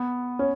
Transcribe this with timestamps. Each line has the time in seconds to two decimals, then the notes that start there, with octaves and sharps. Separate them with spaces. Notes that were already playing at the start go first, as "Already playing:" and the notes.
Already playing: B3
0.39 C#4